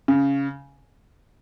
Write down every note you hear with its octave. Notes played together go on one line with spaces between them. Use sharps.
C#3